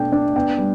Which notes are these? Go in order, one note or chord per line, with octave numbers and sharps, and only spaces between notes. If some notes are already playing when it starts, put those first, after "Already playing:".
Already playing: B2 A3 D4 G5
D4
B3 G5
G3